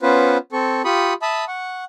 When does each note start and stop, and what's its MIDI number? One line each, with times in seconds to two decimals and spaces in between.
0.02 0.38 59
0.02 0.38 61
0.02 0.38 65
0.02 0.38 71
0.02 0.38 72
0.52 0.82 60
0.52 0.82 69
0.52 0.82 85
0.85 1.14 65
0.85 1.14 67
0.85 1.14 83
0.85 1.14 85
0.85 1.14 87
1.22 1.45 76
1.22 1.45 81
1.22 1.45 83
1.22 1.45 87
1.48 1.85 78
1.48 1.85 85